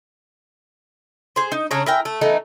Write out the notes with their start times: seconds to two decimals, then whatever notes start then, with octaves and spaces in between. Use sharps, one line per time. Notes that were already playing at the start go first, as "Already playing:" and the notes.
1.36 G#4 C5
1.52 D#4
1.71 C#3 D4 C#5 A#5
1.86 E4 A#4 G5 G#5
2.05 A3
2.21 E3 A3 B3 D#4